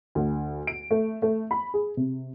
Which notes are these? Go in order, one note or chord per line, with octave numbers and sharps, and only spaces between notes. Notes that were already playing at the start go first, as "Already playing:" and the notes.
D2
D7
A3
A3
B5
G#4
C3